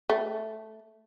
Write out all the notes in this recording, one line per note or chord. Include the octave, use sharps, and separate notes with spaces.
A3